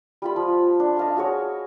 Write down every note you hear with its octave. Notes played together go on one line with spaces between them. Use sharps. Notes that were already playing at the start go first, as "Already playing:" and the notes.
G3 F4 B5
F3
D4
D#5 F5 A5
F#4 G#4 C#5